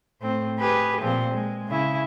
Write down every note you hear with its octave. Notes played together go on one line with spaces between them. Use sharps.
A2 C4
G4 G#4 B4
A#2 F3 C4
G#3
C#3 E4